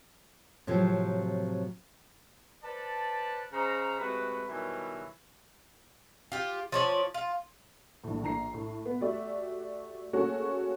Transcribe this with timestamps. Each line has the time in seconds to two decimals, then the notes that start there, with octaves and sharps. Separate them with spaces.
0.67 A2 C3 F3 F#3
2.63 A4 B4 C5 D5 A5
3.52 C#3 C5 D#5 A#5
3.98 C3 G#3 A3 F#4 B4
4.48 B2 D#3 E3 F#3 G3 A3
6.32 F4 G4
6.72 F3 C#5 D5
7.14 F4
8.04 A#1 A2
8.23 A#1 A#5 C7
8.54 A2
8.86 B3
9.01 A3 F#4 G4 D5 E5
10.13 A3 A#3 C#4 F#4 G#4 A4